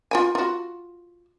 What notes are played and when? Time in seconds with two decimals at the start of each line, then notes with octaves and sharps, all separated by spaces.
0.11 F4 G5 G#5
0.35 F4 F#4